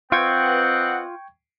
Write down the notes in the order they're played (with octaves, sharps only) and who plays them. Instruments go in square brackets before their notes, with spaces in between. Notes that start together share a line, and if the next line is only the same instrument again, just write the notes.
[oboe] C4 [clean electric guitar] F4 [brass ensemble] B4 D#5 F#5 [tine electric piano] G5 C#6 G#6